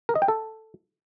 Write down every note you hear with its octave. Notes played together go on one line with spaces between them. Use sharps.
A#4
D#5
G5
A4